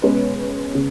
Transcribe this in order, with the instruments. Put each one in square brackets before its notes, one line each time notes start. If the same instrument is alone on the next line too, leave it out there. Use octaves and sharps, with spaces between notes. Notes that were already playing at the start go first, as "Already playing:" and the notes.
[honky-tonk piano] B2 G#3 C#4 B4
C#3